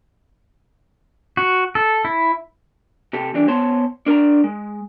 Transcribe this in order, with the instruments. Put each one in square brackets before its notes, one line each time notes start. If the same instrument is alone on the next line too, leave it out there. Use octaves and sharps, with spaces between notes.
[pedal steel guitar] F#4
A4
E4
[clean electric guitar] C3 G4 A4
E3 G3 D4
B3 C5 C#5 A5 C6
D4 A#4 D5 A#5
G#3